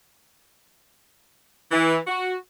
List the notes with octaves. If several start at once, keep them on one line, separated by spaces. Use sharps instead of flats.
E3
F#4